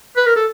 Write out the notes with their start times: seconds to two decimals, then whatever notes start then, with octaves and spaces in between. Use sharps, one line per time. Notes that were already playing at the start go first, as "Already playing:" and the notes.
0.17 B4
0.26 A#4
0.36 A4